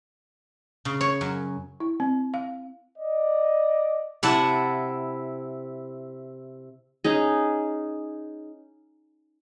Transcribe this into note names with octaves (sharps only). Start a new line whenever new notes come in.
C#3
C#5
F#2
E4
C4
F5
D5 D#5
C3 E4 F#5 A5
C#4 D#4 G#4